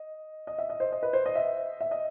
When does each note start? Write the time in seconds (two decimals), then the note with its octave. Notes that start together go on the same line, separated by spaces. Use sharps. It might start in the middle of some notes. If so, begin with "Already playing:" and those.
Already playing: D#5
0.47 D#5
0.59 E5
0.70 D#5
0.80 C5
0.92 D#5
1.03 B4
1.13 C5
1.26 D#5
1.36 E5
1.81 E5
1.91 D#5